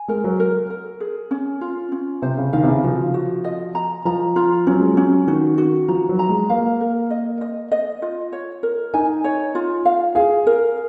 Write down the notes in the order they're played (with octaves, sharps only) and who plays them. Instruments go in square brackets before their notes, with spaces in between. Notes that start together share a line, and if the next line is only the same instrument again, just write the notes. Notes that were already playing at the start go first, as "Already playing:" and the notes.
Already playing: [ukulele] G#5
[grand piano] G#3 [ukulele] A#4
[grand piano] F#3
[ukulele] A#4
A#4
G#4
C#4
F4
C#4
[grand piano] C3 [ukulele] C5
[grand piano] C#3
[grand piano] D#3 [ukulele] F5
[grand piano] C3
C#3
[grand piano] F3 [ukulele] F#4
[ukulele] F#4
D#5
A#5
[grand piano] F3 [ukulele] A#5
[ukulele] F4
[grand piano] F#3 [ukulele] C#4
[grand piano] G#3
[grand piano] F#3 [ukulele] C#4
[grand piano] D#3 [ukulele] F#4
[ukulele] F#4
[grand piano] F3 [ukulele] A#5
[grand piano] F#3
[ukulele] A#5
[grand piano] G#3
[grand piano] A#3 [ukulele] F5
[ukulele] A#4
D#5
D#5
D#5
F4
C#5
A#4
[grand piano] D#4 [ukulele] G#5
[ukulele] C#5
F4
F5
[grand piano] G#4 [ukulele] F5
[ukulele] A#4